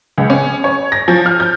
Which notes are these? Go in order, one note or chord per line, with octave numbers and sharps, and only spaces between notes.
C#2
C#4
C#5
A#6
F3
F6
G6